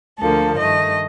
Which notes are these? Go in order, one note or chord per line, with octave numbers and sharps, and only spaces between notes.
D2 D3 F3 A#3 A4
G2 D#3 A3 D#5